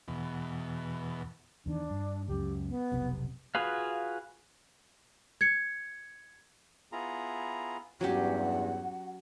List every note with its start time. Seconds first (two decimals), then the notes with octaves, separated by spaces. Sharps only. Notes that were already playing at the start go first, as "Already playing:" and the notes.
0.08 E2 B2
1.66 E2 D#3 D4
1.90 G2
2.28 C#2 F#2 G4
2.69 B3
2.92 F1 B1 C3
3.55 F4 F#4 G#4 B4 F5
5.41 G#6 C#7
6.92 B3 E4 F4 G#4 A#5
8.01 E2 G2 F#3 C#4 G4 F#5